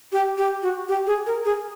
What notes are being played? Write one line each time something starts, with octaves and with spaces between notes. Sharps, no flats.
G4
G4
F#4
G4
G#4
A#4
G#4